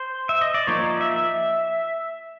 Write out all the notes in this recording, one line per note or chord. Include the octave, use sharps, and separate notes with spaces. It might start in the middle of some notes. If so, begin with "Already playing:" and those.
Already playing: C5
E5
D#5
D5
F3 A#3 D#4 C#5
D5
E5
E5